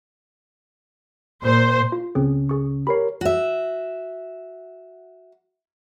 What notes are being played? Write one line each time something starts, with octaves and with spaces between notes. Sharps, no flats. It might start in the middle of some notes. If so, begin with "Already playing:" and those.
A#2 C5
F4
C#2 C#3 C4 C#4 G#4
G#4 C#6
G4 A#4 C#5 B5 C7
F#4 E5